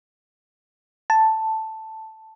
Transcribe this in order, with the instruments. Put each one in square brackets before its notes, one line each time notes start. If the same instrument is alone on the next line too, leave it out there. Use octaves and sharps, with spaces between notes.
[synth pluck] A5